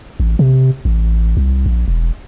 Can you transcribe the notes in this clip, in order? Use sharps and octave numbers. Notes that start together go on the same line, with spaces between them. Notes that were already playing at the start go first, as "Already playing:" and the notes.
A1
C3
A1
C2
A#1
E1